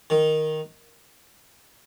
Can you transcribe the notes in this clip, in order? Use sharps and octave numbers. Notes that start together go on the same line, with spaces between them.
D#3